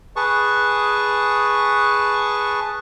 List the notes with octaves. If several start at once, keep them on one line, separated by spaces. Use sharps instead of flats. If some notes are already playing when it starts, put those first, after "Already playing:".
G#4 B4 A5 C#6